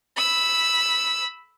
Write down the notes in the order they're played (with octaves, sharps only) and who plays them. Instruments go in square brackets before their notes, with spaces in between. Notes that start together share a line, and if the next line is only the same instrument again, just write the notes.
[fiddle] B5 E6